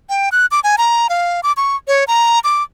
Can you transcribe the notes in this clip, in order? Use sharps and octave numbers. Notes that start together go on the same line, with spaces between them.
G5
F#6
D6
G#5
A#5
F5
D6
C#6
C#5
A#5
D6